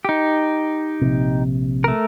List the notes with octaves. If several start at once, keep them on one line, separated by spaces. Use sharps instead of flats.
D#4 G4
A#1 C3
A3 A#4